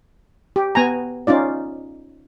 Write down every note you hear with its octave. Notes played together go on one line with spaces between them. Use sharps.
G4
B3 G#5 A#5
C#4 D#4 F4 D5